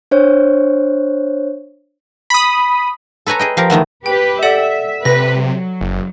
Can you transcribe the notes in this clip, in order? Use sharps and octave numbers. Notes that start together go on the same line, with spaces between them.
D4 C5 C#5
B5 D#6
A4 B4 C#5 G#5 A#5
G#4 D#5 G5
F3 G4 A#4
E2 D#3 A3 B3
G4 B4 G5
A4 D5 E5 F#5
C3 B4 A#6
F#3
F#1